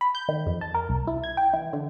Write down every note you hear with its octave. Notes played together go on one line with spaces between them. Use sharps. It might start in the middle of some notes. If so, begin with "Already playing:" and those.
B5
G6
D#3
F2
A5
A#4
C2
E4
G#6
G5
E3
D3